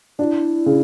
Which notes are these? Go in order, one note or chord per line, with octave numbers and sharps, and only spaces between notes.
D4 E4 F#4
C#3